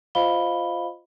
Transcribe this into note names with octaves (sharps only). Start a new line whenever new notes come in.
F4 C5 D#5 F5 B5 G7